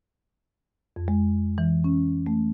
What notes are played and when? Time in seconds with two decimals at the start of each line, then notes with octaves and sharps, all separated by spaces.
0.96 F2
1.08 G#3
1.58 E3
1.84 C#4
2.26 A3